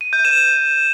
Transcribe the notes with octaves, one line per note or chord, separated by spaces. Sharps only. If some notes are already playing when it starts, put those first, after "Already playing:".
D#7
G6
E7